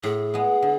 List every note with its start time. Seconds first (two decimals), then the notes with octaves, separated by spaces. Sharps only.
0.03 A2 G#4
0.34 G#3 B3
0.62 D3